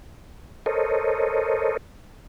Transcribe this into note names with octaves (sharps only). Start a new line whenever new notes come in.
A4 A#4 C5 C#5 D#5